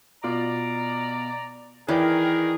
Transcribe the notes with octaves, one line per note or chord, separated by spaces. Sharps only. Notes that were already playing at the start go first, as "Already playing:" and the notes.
B2 F4 D5 A#5
D#3 E3 G#4 A#4 B4 D5 G5